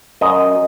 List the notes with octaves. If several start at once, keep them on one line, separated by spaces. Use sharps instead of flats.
F#2 D#5